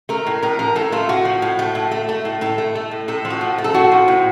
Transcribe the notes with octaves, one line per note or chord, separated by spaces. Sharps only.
A3 A#4
A2
A2 A#4
F3 A#4
A2 A4
A3 F4
A2 F#4
F3
A2
A3
A2
A3
A3
A2
A2 A4
A3
A3
A2
A2 A4
F3
F#4
A2
A3
A4
A2 F#4
F3
A2